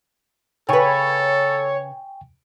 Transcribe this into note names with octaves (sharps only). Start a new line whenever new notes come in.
C#3 A4 B4 C#5 G5 G#5 C#6